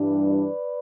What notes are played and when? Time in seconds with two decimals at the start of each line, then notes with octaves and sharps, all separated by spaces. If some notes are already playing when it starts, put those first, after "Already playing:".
Already playing: G2 E3 G3 D4
0.30 B4 D5